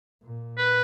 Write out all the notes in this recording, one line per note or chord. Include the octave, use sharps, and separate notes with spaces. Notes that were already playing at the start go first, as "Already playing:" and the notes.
A#2
B4